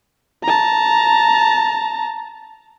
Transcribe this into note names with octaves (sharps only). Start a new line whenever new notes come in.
A5 A#5